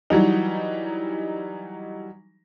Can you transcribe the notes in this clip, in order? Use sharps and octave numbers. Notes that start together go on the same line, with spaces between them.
E3 F#3 G3 D#4